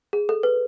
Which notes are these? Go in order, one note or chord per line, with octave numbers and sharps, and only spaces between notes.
G#4
A4
B4